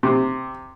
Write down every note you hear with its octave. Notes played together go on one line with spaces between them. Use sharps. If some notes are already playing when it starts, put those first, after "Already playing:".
C3